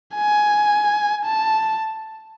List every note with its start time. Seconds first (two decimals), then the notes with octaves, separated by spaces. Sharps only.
0.15 G#5
1.25 A5